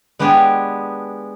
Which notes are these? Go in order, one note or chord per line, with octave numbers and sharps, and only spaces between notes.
G#3 B3 D4 G4 G#4